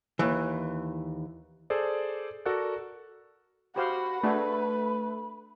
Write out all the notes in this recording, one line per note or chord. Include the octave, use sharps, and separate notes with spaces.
D#2 E3
G#4 A4 C5 D5
F#4 A4 A#4 D5 F#5 F#6
F#4 G4 C5 F5 F#5 B5
A3 D4 F#4 G#4 B4